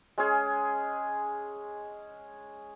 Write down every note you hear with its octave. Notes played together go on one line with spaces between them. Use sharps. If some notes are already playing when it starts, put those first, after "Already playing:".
G#3 C#4 G#4